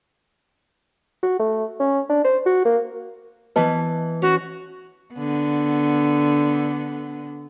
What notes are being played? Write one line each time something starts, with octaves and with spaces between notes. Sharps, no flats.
F#4
A3
C#4
D4
C5
F#4
A#3
E3 B3 B4 D#5 A5
C#4 F#4
D3 B3